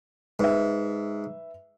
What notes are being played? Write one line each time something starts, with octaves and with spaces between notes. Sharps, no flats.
G#2 B4 E5